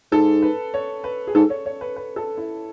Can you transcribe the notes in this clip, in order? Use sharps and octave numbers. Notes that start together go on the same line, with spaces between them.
G#2 A4
B4
C#5
B4
G#4
G#2 A4
C#5
C#5
B4
B4
A4
E4